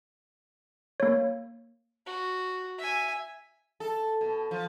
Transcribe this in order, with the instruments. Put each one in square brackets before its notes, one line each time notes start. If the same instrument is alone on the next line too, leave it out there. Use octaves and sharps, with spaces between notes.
[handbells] A#3 C#5
[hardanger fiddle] F#4
E5 G#5
[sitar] A4
B2
F3